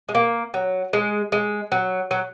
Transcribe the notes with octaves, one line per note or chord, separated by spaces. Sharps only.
G#3
A#3
F#3
G#3
G#3
F#3
F#3